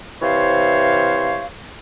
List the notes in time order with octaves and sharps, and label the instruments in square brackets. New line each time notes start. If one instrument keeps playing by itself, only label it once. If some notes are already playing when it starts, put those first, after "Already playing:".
[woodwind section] C3 E3 C5 C#5 F5